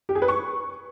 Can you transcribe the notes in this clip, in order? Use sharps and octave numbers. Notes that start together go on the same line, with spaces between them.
G4
G#4
B4
C#6